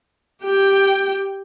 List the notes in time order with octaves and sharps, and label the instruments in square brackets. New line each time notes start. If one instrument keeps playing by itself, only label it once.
[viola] G4 G5